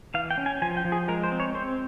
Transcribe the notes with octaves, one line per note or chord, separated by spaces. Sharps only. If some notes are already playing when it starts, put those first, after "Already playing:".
E3 F5
G5
C#4
G#5
F3 G#5
G5
F3
G#4
G#3 A#4
C5
C4
C#5
C4 C5